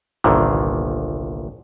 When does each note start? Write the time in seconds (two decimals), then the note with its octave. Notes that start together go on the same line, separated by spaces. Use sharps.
0.24 G1 C2 A#2 D3 D#3